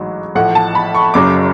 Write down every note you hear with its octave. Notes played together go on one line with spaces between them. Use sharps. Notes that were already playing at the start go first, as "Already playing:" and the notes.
Already playing: A1 G#2 F#3
A1 A2 F3 F#5
A5
B5
C#6
F#1 F#2 C#3 F#3 D6